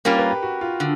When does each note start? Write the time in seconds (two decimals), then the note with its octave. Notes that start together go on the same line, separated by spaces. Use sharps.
0.05 G3 A#3 C#4 F4 A#4
0.18 B4
0.31 G4
0.43 F#4
0.61 F4
0.80 D3